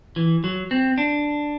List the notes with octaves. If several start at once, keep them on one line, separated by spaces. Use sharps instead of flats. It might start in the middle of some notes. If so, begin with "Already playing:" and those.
E3
F#3
C4
D4